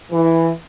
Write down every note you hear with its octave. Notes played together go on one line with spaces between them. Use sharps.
E3